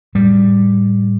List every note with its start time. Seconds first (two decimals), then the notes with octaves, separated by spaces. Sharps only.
0.15 A2 G3